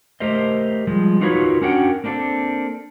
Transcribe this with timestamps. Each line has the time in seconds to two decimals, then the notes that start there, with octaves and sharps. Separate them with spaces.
0.20 A3 G4 A#4 C5 D#5
0.87 F3 G3 G#3
1.21 D#4 F4 F#4 A#4 B4 C#5
1.62 C#4 D4 F#4 A#4 F#5 G5
2.04 A#3 C4 D4 F#4 A4